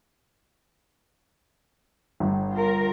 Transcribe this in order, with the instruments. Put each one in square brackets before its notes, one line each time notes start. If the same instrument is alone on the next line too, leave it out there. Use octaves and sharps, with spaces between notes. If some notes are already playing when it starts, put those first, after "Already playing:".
[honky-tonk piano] G1
[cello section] F4 A#4